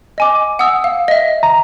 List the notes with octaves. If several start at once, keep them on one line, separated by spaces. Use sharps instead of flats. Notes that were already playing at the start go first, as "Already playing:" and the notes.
D#5 G#5 D6
F#5 D#6 E6
F5
D#5 E5
A#5